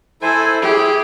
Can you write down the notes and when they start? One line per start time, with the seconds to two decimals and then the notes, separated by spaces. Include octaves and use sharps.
0.22 E4 A4 C5 G#5
0.62 E4 G4 G#4